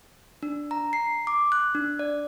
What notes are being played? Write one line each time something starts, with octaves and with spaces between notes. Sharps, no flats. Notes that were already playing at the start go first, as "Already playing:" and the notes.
D4
A#5
C7
D6
F#6
D4
D5